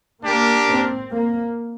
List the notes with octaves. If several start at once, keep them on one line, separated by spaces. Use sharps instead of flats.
A#3 D4 G4 A#4
C4
A#3